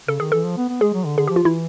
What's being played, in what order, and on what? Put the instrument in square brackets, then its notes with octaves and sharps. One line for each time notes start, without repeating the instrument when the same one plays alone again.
[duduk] C#3 [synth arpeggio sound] A4
[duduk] D#3 [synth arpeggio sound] G#4
[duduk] E3 [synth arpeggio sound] A4
[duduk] F3
B3
B3
[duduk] G#3 [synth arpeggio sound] G#4
[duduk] F#3
D3
[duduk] D3 [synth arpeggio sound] G#4
[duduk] F3 [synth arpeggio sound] G4
[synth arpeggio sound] F4
[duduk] E3 [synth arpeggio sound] E4